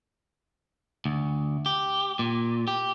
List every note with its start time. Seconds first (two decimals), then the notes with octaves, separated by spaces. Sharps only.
1.05 D2
1.66 G4
2.19 A#2
2.68 G4